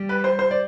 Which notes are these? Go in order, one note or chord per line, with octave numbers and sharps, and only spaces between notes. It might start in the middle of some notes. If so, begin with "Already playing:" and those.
Already playing: G3
B4
C5
C5
D5